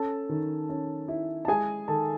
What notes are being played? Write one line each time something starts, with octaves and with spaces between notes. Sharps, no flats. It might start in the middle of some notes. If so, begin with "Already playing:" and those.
Already playing: C#4 A4 A5
D#3
C#4
E4
A5
G#3 G#4 G#5
D#3 A4 A5